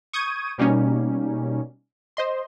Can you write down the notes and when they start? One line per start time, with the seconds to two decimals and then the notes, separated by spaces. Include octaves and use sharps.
0.13 C#6 D#6 G6 G#6 D#7
0.58 B2 G3 A#3 C#4 D#4
2.17 C5 D#5 C6